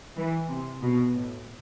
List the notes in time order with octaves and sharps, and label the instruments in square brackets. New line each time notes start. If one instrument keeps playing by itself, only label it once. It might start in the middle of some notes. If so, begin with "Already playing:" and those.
[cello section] E3
C3
B2
A2